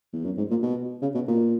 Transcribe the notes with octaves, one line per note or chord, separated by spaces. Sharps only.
E2
F#2
G#2
A#2
B2
C#3
B2
A#2